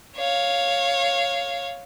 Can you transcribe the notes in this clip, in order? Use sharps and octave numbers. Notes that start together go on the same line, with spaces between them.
C#5 F5